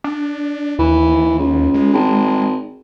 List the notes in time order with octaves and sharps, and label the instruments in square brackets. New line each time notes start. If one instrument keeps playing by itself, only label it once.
[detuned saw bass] D4
[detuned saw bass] D#2 [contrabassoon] E3
[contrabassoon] C#2
[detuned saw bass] G#3
[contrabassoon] G#1